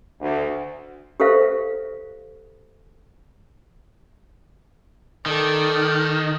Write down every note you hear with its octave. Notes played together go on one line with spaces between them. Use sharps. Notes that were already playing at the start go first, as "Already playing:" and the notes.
D2
G4 A4 B4 C5 E5 F5
D#3 A4 D5